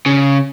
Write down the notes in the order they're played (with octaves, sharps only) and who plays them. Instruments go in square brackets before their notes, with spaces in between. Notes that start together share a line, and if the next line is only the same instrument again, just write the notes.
[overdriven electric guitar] C#3